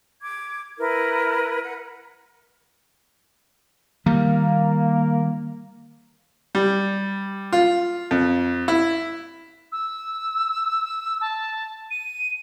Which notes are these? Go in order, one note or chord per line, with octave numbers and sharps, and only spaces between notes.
D6 G#6
E4 A#4 B4
F#5
D#3 G3 A#3
G3
F4
F2
E4
E6
A5
D#7